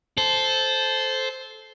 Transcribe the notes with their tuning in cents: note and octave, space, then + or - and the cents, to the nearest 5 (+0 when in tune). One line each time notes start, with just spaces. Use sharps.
A4 -15 C5 +0